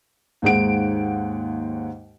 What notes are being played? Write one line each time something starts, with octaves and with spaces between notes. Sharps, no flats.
D#2 G#2 F#5 D7